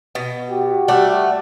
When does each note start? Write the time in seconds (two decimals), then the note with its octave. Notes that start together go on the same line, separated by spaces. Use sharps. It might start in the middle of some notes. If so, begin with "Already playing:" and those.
0.15 B2
0.50 F#4 G4
0.88 G3 A3 F#5